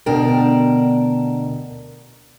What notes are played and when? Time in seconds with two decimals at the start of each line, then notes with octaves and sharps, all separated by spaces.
0.06 D2 B2 D4 A#4 G5